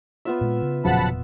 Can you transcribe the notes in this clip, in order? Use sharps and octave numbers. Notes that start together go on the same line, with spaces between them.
B3 F4 E5
A#2 G#3
C#3
E1 A#2 C#3 F3 F#3 F#5 A5 B5